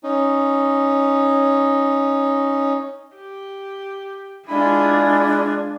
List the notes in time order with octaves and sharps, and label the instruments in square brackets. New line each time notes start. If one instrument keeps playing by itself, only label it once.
[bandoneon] C#4 D#4
[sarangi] G4
[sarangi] G#3 [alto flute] D4 [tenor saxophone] E4 [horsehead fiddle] F4 G#4